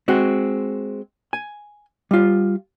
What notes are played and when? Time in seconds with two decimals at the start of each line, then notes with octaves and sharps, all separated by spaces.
0.08 G#3 C4 F#4
1.33 G#5
2.11 G3 F4